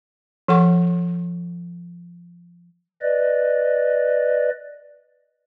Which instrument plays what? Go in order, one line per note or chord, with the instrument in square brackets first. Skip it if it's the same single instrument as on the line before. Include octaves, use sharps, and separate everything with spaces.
[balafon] F3 A4 F#5 C#6
[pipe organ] B4 D5 D#5